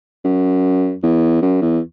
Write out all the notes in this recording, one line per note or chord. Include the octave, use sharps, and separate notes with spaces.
F#2
E2
F#2
E2